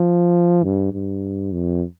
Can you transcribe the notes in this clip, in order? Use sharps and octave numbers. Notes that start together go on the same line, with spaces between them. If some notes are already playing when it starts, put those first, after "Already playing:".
Already playing: F3
G2
G2
F2